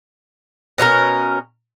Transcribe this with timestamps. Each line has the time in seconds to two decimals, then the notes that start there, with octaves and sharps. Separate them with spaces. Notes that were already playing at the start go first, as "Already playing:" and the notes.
0.78 B2 C#4 F4 A#4